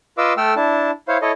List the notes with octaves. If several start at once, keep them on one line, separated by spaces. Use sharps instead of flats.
F4 B4 D#5 F5 D6 E6
A3 A4 G5 E6 F6
D4 E4 A5
E4 C5 C#5 F5
E4 A4 C#5 D#5